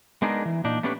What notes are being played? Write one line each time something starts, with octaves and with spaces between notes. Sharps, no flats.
G#3 B3 D4 D#4 G#4 A#4
E3
A#2 D4 D#4
A3 B3 C#4 D4 G4 B4